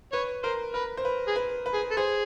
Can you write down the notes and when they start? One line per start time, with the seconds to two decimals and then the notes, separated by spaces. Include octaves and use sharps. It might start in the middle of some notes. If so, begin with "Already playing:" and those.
0.12 B4 C#5
0.43 A#4 C5
0.74 A#4 B4
0.97 C5
1.05 B4
1.28 G#4
1.36 B4
1.66 B4
1.74 G#4
1.91 A4
1.97 G#4 C5